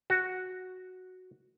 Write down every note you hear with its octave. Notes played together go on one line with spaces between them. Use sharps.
F#4